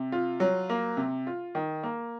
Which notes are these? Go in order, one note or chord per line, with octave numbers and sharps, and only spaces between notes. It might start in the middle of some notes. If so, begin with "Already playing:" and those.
Already playing: C3
F4
F#3
A#3
C3
F4
D#3
A#3